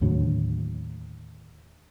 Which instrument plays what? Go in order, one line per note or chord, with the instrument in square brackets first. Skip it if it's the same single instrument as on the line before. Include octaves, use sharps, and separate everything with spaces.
[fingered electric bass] D#2 A2 D3 F#3